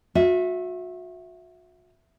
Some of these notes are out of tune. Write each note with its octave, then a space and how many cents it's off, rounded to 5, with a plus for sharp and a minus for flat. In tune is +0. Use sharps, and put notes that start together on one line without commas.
F#4 -35 E5 +0